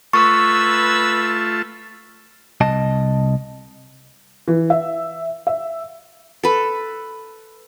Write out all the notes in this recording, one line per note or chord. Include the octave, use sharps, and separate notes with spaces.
A3 F4 B4 A5 C#6 E6 G#6
C2 D#5 A5
E3
E5
E5
A4 B4